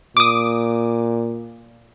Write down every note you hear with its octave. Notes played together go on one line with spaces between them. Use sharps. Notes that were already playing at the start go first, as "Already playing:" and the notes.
A#2 D6 D#6